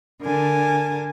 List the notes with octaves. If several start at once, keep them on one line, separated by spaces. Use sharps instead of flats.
D3 A#4 G#5 A5